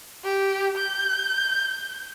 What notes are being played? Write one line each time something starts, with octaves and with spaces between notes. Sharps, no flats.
G4
G6